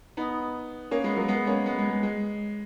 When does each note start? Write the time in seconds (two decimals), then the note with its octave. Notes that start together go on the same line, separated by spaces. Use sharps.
0.17 B3 D#4
0.91 A#3 C#4
1.04 G#3 B3
1.16 F#3 A#3
1.28 G#3 B3
1.47 A#3 C#4
1.66 G#3 B3
1.78 G#3
1.90 G#3
2.03 G#3